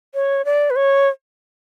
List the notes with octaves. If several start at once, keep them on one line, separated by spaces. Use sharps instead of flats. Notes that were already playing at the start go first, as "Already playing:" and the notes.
C#5
D5
B4
C#5